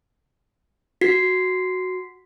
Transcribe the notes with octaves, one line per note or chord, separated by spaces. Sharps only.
F#4 B6 C7